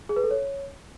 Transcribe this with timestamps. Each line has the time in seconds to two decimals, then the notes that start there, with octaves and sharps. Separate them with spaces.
0.09 G#4
0.16 B4
0.23 A4
0.31 C#5